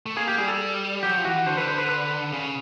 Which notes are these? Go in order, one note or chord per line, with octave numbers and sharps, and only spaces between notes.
A3
A#3 G#4
G4
G3 G#4
A4
F#3 G4
F3
E3 F#4
D3 C5
B4
C5
B4
B4
C#3